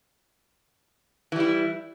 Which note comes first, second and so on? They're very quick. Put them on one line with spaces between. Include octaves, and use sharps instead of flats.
E3 G3 E4